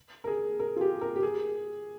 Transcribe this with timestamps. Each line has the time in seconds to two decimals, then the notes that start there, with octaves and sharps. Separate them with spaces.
0.24 A#4
0.27 G#4
0.60 A#4
0.76 F4
0.81 G4
1.01 A#4
1.16 G4
1.23 G#4